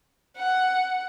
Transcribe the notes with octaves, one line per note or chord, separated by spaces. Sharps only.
F#5